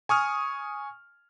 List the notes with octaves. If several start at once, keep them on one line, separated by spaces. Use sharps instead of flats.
G#5 C#6 D#6 F6